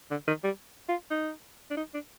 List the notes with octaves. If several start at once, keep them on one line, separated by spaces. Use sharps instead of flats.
D3
D#3
G3
F4
D#4
D4
D#4
D4